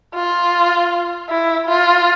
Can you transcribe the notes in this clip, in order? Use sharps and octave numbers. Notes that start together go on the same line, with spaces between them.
F4
E4
F4